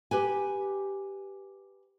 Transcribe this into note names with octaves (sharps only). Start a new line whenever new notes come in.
G4 B4 G#5